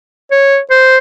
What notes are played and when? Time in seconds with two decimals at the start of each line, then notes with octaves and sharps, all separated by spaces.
0.31 C#5
0.70 C5